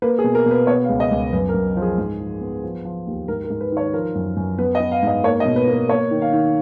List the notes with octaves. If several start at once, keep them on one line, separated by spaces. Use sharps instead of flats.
A#3 B4
G#4
B2
A#4
B2 B4
B3 C#5
F5
C#2
D#5
C#2
F#2 B4
A#4
F#2
F3
G#4
G#2
F3
B3
F3
F3
D#2
G#2 A#4
A#4
G#2
B4
D#3
C#5
F3 A#4
F#2
F#2
B3 B4
D#5
B3
F5
G#2 D#5
A#3 C#5
D#5
B2
B4
A#3
B4
A#3 C#5
D#3
F5
D#3